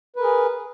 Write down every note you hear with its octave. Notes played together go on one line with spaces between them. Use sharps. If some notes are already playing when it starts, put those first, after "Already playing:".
G#4 A#4 B4